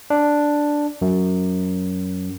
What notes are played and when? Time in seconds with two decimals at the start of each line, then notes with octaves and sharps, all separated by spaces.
0.10 D4
1.02 F#2